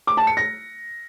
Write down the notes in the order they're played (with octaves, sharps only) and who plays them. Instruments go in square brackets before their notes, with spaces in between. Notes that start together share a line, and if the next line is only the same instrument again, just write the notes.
[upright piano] D6
A5
C#7
A#6